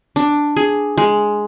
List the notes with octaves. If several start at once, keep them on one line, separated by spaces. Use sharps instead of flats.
D4
G#4
G#3